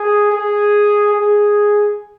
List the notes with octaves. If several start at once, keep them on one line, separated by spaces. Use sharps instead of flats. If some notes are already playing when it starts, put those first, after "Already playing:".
Already playing: G#4
G#4
G#4